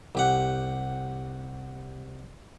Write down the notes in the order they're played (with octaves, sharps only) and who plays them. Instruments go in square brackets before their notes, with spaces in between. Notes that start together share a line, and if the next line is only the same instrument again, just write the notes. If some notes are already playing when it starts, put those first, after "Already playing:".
[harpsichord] C2 G4 F#5